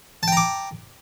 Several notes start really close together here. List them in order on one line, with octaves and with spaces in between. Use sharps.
A5 G5 A#5 D6